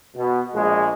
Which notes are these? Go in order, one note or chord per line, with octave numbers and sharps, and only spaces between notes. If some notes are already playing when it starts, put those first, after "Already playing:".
B2
A#1 G#3